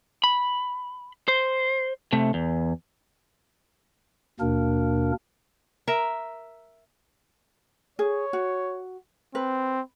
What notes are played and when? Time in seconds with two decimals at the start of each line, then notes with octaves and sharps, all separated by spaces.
0.24 B5
1.28 C5
2.13 C3 A3
2.34 E2
4.40 D#2 B2 A#3 D4 A#4
5.88 A#4 E5
7.99 G#4 C#5
8.33 F#4
9.35 C4 B4